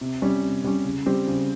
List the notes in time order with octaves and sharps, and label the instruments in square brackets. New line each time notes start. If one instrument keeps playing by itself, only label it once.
[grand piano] C3
G3 C#4
C3
G3 C#4
C#3
G3 C4 G4 C5
C#3